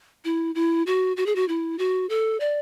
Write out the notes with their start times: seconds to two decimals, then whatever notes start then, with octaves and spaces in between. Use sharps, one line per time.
0.25 E4
0.55 E4
0.87 F#4
1.17 F#4
1.26 G#4
1.36 F#4
1.48 E4
1.79 F#4
2.10 A4
2.40 D5